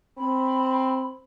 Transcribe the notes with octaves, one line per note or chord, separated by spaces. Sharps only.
C4 B5